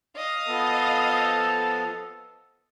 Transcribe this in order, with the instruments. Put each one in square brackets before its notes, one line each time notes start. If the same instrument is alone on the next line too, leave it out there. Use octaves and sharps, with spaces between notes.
[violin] D#5 F5
[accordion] F3 B3 [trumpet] A4